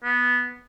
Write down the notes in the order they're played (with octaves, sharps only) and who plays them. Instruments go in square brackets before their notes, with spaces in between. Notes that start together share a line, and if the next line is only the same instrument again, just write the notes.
[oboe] B3